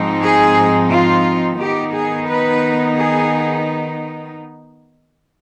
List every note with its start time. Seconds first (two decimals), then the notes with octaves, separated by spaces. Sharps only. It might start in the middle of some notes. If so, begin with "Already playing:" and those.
Already playing: G#2 F3 C4 D#4
0.22 G#4
0.90 F4
1.59 D#3 B3 D#4 G4
1.94 G#4
2.28 B4
2.98 G#4